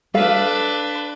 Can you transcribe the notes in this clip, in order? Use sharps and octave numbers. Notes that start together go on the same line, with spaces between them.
D4 A4 B4 F5